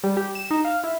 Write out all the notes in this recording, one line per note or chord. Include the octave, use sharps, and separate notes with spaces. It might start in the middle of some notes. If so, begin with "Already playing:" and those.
G3
G4
E7
D#4
F5
E4